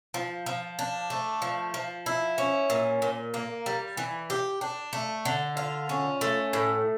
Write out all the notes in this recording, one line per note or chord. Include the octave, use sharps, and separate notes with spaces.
F3
F3
D4
A3
F3
F3
E4
C#4
A#2
A#2
A#3
G3
E3
G4
D4
A3
D3
F4
C#4
A3
A2